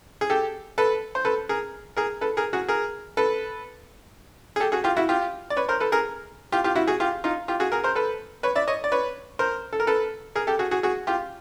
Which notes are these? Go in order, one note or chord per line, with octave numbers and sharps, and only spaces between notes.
G#4
G4 A4
A4 B4
C5
A4 B4
G#4 A#4
G#4 A#4
A4 B4
G#4 A#4
F#4 G#4
G#4 A#4
A4 B4
G#4
G4 A4
F#4 G#4
F4 G4
E4 F#4
F4 G4
D5
B4 C#5
A#4 C5
A4 B4
G#4 A#4
F4 G4
F4 G4
E4 F#4
F#4 G#4
F4 G4
D#4 F4
F4 G4
F#4 G#4
G#4 A#4
A#4 C5
A4 B4
B4 C#5
D5 E5
C#5 D#5
D5
B4 C#5
A#4 C5
A4
A#4
A4 B4
G#4 A#4
G4 A4
F#4 G#4
F#4 G#4
F#4 G#4
F4 G4